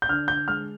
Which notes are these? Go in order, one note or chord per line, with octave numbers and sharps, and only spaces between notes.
G6
D3 F6
D3 G6
G#3 F6